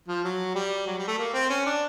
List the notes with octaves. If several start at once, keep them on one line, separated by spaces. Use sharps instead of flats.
F3
F#3
G3
F#3
G3
A3
A#3
C4
C#4
D4